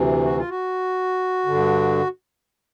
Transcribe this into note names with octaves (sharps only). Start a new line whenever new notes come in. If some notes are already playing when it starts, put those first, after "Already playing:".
Already playing: D2 C3 E3
F#4
F4
F#4
G2 D3